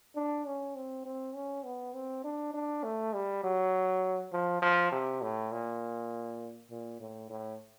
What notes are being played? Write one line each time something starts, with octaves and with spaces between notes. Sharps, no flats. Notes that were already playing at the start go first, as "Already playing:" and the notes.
D4
C#4
C4
C4
C#4
B3
C4
D4
D4
A3
G3
F#3
F3
F3
C3
A2
A#2
A#2
A2
A2